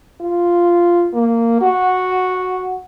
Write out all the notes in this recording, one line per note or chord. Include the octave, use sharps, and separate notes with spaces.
F4
A#3
F#4